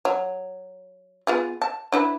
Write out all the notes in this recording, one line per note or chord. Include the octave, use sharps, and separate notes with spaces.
F#3
B3 F4 G#4
A5
D4 E4 B4